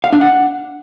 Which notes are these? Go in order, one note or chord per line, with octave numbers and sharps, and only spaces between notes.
F5
D4
F#5